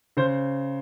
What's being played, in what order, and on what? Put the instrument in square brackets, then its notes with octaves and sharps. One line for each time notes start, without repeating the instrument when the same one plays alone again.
[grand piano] C#3 C5